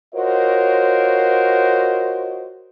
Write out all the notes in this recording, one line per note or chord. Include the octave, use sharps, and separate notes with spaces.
F4 F#4 A#4 C5 C#5 D#5